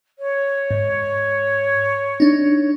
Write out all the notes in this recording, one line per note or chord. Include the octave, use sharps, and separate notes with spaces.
C#5
G#2
D4 D#4